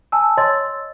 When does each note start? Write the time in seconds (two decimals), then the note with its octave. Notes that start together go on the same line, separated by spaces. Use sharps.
0.12 G#5 A5 E6
0.37 C#5 D#5 C6 E6 G#6 A6